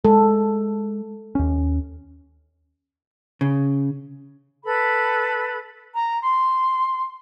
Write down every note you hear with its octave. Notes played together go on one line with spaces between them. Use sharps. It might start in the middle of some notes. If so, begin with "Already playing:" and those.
G#3 A4
D#2 C#4
C#3
A4 B4 B5
A#5
C6